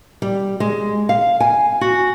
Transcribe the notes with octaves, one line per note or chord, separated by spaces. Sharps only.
G3
G#3
F5
G#5
F#4